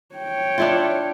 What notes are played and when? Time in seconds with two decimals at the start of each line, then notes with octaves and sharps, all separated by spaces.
0.15 C#5 G5
0.58 D4 E4 F4